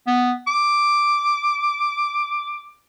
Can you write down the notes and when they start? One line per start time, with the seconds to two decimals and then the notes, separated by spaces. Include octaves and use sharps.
0.07 B3
0.47 D6